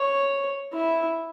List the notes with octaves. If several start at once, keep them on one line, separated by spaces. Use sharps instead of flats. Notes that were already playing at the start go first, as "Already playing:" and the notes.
Already playing: C#5
E4